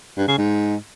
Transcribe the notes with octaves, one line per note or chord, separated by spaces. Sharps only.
G2
C#3
G#2